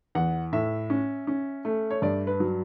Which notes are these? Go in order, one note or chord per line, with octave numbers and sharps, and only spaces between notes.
E2 F#5
A2 E5
C#4
C#4
A3
C#5
G2 D5
B4
F#3